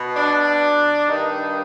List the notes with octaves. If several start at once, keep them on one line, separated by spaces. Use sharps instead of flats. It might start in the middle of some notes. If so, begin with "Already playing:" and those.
Already playing: B2
D4
G2 D#3 D#4